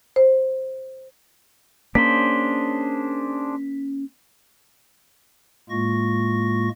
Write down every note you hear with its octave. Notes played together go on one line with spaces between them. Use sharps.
C5
A#3 C#4 D4 G#4 C5 B6
A2 G#3 A#3 F4 C#6 A#6